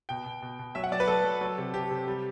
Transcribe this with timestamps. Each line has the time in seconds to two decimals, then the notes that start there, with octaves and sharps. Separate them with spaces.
0.09 B2 G5
0.26 B2
0.42 B2
0.59 B2
0.75 F#3 E5
0.84 F#5
0.92 F#3 D5
1.00 B4
1.07 F#3 A4
1.24 F#3
1.41 F#3
1.58 C3
1.73 C3 G4
1.91 C3
2.07 G3